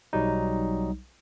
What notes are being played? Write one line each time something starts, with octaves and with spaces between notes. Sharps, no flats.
B1 F#3 G3 D#4